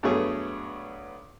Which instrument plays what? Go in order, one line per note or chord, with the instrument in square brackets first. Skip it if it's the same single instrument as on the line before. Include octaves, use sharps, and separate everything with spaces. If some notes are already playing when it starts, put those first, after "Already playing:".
[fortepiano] G2 F#3 A3 B3 G#4 C#5